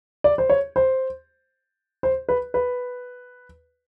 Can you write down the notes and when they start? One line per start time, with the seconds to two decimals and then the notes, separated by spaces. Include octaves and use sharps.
0.24 D5
0.38 C5
0.50 C#5
0.76 C5
2.03 C5
2.29 B4
2.54 B4